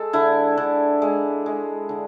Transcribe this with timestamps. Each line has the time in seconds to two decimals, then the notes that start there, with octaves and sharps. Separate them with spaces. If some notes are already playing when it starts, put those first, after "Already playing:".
Already playing: G#3 A4
0.13 D3 E4
0.57 D3
1.02 G#3
1.46 G#3
1.89 D3